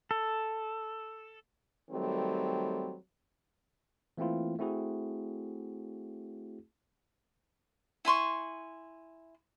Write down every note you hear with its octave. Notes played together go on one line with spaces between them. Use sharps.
A4
D#3 F#3 G3 A3 C4
E3 A3 A#3 C4 E4 F4
A3 C4 E4 F#4 G#4
E4 G#5 C6 C#6